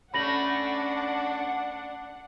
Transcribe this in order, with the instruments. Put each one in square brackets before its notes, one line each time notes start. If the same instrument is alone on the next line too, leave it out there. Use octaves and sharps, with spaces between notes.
[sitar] A3 C#4 [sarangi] D4 [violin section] F#5 [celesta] B5 A#6 F#7